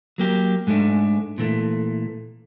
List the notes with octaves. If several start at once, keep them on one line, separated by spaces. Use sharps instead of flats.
F#3 A#3 G4
G#2 G#3 A3 D4
A#2 E3 A3